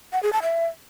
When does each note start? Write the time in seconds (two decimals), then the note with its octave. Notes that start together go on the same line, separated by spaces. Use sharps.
0.13 F#5
0.23 G#4
0.33 A5
0.43 E5